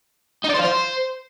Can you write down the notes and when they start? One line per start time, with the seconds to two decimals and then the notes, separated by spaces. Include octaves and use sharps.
0.44 D#4
0.49 D5
0.54 C5
0.59 F4
0.64 C5